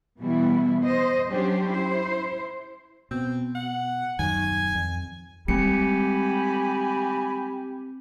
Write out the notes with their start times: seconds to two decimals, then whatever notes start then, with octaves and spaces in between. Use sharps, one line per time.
0.20 B2 E3 G3 B3 E4
0.82 C5 D#5
1.29 F#3 C#4 D4 G4 C5
1.68 E4 C5
3.11 B2 C4
3.55 F#5
4.19 D#1 F#2 D#3 G#5
4.75 F2
5.48 G3 G#3 C4 G4 G#5 B5 C#7